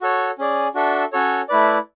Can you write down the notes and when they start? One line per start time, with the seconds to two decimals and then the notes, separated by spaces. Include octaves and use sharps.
0.01 F#4 A4 C#5
0.38 C#4 G#4 D5
0.74 D4 F#4 A4 E5
1.12 C#4 F#4 A4 C#5
1.49 A3 E4 B4 D5